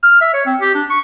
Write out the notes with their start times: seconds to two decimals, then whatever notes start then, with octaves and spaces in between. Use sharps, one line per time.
0.03 F6
0.21 E5
0.34 C#5
0.46 C4
0.61 G4
0.75 D4
0.90 C#6